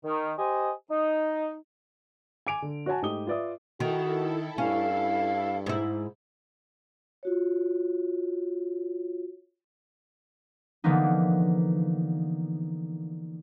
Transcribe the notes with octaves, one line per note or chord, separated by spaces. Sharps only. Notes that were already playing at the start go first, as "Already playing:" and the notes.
D#3
G4 C5 D#5 G#5
D#4
G#5 D6 D7 F7
D3
F#4 C#5 F#5 G#5 A5
G#2 A3 G4 D#6 G7
F4 B4 D5 E5 D#6
D#3 E4 F#4 A4
G2 C#4 F5
G#2 E4
F4 F#4 C#5
D3 E3 F3 A#3 B3 D#4